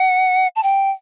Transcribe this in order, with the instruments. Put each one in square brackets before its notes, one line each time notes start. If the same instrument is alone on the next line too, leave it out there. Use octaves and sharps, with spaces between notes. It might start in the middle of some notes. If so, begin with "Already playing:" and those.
Already playing: [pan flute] F#5
A5
G5